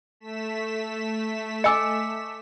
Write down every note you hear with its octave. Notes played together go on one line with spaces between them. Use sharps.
A3 B6 E7
D#5 G#5 D6 E6 C#7